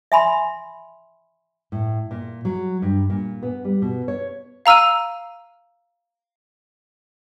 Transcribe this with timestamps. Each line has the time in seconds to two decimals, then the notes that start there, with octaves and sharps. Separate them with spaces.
0.12 E5 G#5 B5 C6
1.72 A2
2.11 A#2
2.45 F#3
2.82 G2
3.10 A#2
3.43 B3
3.65 G3
3.82 B2
4.08 C#5
4.66 F5 A#5 E6 F6 D#7